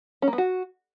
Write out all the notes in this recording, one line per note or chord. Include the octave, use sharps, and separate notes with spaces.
C#4
A#3
B3
F#4